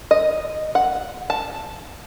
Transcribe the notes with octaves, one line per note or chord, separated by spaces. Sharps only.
D#5
F#5
A5